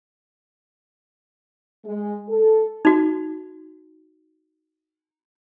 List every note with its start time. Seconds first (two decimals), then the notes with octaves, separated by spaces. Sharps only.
1.86 G#3
2.29 A4
2.85 D#4 F#4